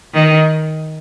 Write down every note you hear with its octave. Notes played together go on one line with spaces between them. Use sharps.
D#3